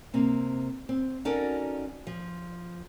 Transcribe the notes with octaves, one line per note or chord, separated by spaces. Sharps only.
C3 A#3 C4
C4
C#4 D#4 F#4 A4 A#4 D5
F3